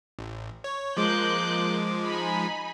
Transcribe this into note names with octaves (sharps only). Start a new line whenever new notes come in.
A1
C#5
F3 G#3 A#3 D6 F#6 G6
D#4 G#5 B5